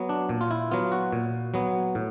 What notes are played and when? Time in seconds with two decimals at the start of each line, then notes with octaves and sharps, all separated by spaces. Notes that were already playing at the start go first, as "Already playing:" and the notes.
Already playing: F#3 B3
0.09 D4
0.29 A#2
0.41 F4
0.51 E4
0.71 F#3 B3 F4
0.92 F#4
1.12 A#2
1.54 F#3 B3
1.95 A2